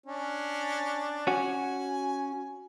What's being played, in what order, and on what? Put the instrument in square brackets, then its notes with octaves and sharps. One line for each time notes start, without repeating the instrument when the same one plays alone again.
[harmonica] C#4 D4
[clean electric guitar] C#4 F#4 [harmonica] G#5